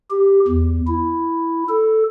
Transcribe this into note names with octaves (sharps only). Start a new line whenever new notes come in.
G4
E2
E4
A4